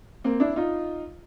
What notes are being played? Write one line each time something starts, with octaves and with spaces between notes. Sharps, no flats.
A#3 C4
D4 E4
D#4 F4